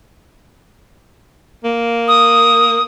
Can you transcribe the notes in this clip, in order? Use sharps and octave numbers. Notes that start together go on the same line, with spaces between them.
A#3
D#6